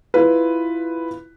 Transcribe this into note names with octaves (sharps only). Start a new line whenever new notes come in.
E4 F4 B4